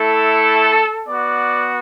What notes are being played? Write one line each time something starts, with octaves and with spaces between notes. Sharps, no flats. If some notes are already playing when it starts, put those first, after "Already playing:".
Already playing: A3 E4 A4
B3 F#4 D5